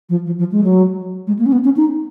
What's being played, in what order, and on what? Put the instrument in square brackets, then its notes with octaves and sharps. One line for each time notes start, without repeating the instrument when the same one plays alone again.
[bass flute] F3
F3
F3
G#3
F#3
G#3
A#3
C#4
B3
C#4
D#4